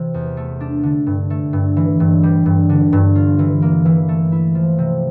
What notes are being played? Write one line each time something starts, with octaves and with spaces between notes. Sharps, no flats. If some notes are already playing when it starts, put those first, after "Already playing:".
Already playing: C3 E3
E2
A3
D4
D3
G2
A3
G2
E3
G2
G3
G2
D3
G2
F4
E3
A#3
E3
A3
E4
F3
C3